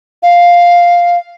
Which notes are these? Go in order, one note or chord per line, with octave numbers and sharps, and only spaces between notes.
F5